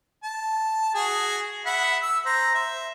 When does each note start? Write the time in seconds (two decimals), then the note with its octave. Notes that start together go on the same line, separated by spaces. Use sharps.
0.24 A5
0.94 F#4 G#4
1.66 E5 F#5 B5
2.02 E6
2.26 C5 A#5
2.54 E5